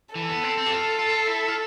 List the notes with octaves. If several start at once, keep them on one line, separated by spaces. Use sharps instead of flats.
E3 A4
B3
C4
C4
G4
F4
F4
E4
F4